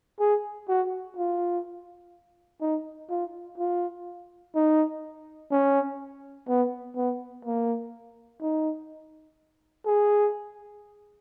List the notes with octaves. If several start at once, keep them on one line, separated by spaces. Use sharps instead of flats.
G#4
F#4
F4
D#4
F4
F4
D#4
C#4
B3
B3
A#3
D#4
G#4